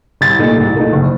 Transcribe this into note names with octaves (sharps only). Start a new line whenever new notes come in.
C2 A6
A#2 A3 D#4
C2
A#2 A3 D#4
F#1